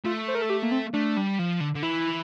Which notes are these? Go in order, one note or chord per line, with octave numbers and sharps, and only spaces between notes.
A3 F4
C5
A#4
A4
G4
A#3
C4
A3 D4
G3
F3
D3
D3
E3 E4